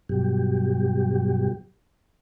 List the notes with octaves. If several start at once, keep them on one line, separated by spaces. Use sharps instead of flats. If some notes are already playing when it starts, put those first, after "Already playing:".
G2 B2 F#3 G4